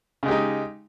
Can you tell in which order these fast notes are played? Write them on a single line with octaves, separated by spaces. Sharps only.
C#3 G#3 G4 D#4